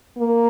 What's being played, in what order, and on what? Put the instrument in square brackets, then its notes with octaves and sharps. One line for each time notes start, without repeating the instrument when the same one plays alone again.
[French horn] A#3